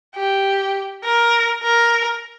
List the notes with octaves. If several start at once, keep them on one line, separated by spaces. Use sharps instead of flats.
G4
A#4
A#4